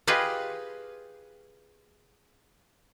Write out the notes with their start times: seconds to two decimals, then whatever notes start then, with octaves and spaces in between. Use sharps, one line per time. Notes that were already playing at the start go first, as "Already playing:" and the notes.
0.07 F4 G4 G#4 B4 D#5